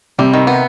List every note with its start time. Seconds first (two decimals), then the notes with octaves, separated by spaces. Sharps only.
0.18 C3 G3
0.34 D#3
0.47 B3